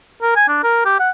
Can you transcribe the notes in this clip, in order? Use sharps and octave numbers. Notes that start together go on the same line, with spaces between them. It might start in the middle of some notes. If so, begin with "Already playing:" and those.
A#4
G#5
D4
A#4
G4
F#5